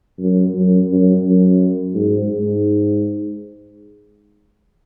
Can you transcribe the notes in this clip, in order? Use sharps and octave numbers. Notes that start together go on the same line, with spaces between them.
F#2
F#2
F#2
F#2
G#2
G#2